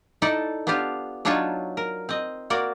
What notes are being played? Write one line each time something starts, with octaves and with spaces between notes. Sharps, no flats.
D#4 E4 A4 D5
B3 D4 F4 G4 F5
F#3 D4 D#4 F4 C#5 A5
A#4
C4 D#5
A#3 F#4 A#4 D5